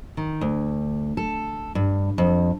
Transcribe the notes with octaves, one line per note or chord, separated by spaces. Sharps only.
D#3
D2
A4
G2
F2